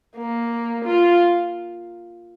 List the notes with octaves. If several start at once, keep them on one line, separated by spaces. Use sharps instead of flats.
A#3
F4